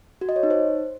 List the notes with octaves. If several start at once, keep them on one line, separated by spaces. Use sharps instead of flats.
F#4
D#5
C#5
D#4
C5